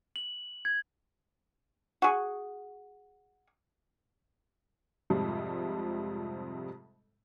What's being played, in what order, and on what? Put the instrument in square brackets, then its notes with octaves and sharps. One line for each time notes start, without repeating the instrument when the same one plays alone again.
[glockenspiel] F#7
G#6
[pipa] F#4 G#4
[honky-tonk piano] F2 G#2 C3 F3 G3